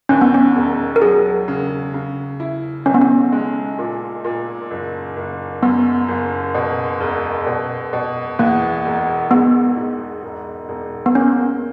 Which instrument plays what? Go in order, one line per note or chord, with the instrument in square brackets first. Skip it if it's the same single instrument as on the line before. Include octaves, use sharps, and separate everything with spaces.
[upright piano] D#2 [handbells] C#4
[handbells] B3
C#4
[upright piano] E1
[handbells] A#4
[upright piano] F#3 [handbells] G#4
[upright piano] C#3
C#3
E4
[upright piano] B1 [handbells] C#4
[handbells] B3
C#4
[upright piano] G#3
A#2
A#2
F#1
F#1
[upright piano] F#2 [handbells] B3
[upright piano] F#1
B2
E1
B2
B2
[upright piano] E2 [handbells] A#3
[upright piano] E1
[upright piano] G#2 [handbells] B3
[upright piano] G#2
E1
E1
[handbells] B3
[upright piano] A#3 [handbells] C#4